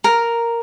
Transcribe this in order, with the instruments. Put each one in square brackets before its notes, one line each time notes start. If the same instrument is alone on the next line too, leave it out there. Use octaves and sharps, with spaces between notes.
[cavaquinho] A#4